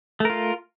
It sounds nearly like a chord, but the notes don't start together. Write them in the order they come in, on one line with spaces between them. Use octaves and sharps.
A3 A#4 F4